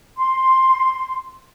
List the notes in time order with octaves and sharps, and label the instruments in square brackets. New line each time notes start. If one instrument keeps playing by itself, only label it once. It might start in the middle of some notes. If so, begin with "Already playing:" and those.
[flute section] C6